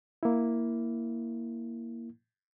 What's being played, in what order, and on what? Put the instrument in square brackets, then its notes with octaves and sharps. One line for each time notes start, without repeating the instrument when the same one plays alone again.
[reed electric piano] A#3 E4